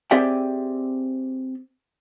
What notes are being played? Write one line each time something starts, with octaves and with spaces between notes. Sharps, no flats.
C4 G4 G#4 D5 E5 G5